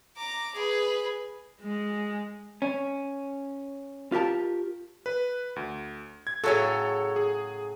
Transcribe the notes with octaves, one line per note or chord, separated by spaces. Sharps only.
A#5 D6
G#4 B4
G#3
C#4
F4 G4 A#4 A5
B4
D2
G#6
A2 C#3 F#3 A4 C#5
G#4